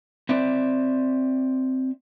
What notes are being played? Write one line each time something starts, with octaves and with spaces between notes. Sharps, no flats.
C4 D5 E5